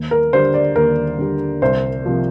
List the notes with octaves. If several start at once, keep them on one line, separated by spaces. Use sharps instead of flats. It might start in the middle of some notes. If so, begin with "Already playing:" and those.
Already playing: D#2
A#4
D3 G3 C5
D5
D#2 A#4
D3 G3
C2 C5
C3 F3 A#3